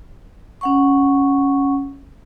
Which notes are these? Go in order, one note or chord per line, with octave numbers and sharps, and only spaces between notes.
C#4 F#5 C#6